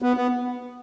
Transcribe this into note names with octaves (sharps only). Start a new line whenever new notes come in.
B3
B3